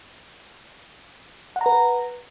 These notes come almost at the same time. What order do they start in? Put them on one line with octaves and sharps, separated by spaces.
F#5 A#5 B4